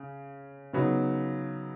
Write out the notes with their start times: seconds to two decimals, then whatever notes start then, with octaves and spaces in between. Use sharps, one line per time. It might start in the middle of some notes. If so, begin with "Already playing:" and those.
Already playing: C#3
0.73 C#3 F#3 B3 D#4